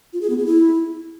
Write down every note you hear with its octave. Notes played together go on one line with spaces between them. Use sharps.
F4
G#4
B3
G#4
E4